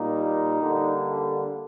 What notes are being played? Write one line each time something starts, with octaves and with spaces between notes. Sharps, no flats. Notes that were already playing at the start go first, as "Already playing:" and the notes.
Already playing: A#2 G3 A#3 D#4
D3 G3 A#3